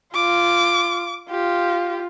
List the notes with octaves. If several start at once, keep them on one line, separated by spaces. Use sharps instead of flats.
F4 D6
F4 G4